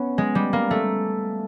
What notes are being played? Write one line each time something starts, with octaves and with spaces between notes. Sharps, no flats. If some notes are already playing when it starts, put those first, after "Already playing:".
Already playing: B3 C#4
G#3
G3
A#3
A3